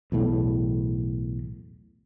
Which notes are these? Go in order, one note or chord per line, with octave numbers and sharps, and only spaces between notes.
B1 E2 A2